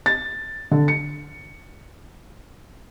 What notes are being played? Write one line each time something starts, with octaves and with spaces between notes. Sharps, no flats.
A6
D3
C#7